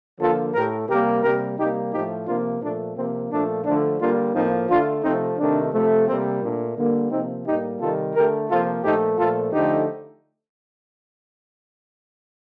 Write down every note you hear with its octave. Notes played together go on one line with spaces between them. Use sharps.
D3 F3 A#3 F4 A4
A2 A3 G4 A#4
C3 G3 A#3 G4 A#4
C3 G3 A#3 G4 A#4
C3 G3 A#3 D#4 G4
A2 F3 A3 D#4 G4
C3 F3 A#3 D4 F4
A#2 F3 A3 D4
C3 F3 A#3 C4
A#2 F3 A3 D4
D3 F3 A3 D4
D3 G3 A#3 D4 F4
A2 F3 A#3 C4 D#4
D3 A3 D4 F4
C3 F3 A3 C4 D#4
C3 D#3 A3 D4
C3 F3 A3
C3 G3 A#3 C4
A#2 A3 D4
D3 G3 A#3
C3 F3 A#3 C4 D#4
A2 G3 A#3 D#4 G4
C3 D#3 G3 F4 A4
D3 A3 G4 A#4
C3 F3 A#3 F4 A4
A#2 F3 A3 D#4 G4
A#2 F3 A3 F4 A4
D3 F3 A3 D#4 G4